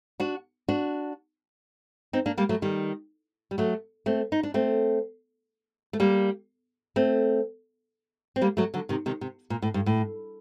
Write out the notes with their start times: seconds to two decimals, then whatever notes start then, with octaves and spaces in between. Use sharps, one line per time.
0.20 D4 F#4
0.68 D4 F#4
2.13 C4 D#4
2.26 A#3 D4
2.37 G3 A#3
2.49 F#3 A3
2.62 D#3 G3
3.51 G3
3.58 F#3 A3
4.06 A3 C4
4.32 D#4
4.43 D4
4.54 A3 C4
5.93 A3
6.00 G3 A#3
6.96 A3 C4
8.36 C4
8.41 G3 A#3
8.57 F#3 A3
8.74 D3 F#3
8.89 C3 D#3
9.06 C3 D#3
9.21 C3
9.50 A#2
9.62 A2
9.74 G2
9.86 A2